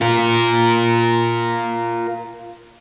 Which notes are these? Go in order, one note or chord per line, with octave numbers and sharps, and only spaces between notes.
F4 A#4